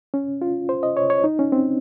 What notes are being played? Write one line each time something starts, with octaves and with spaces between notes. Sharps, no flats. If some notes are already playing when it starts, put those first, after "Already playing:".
C#4
F4
C5
D#5
C#5
C#5
D#4
C#4
C4